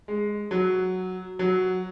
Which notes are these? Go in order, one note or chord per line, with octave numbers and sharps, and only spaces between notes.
G#3
F#3
F#3